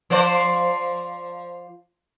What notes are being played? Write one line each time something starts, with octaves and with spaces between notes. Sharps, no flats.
F3 C5 D5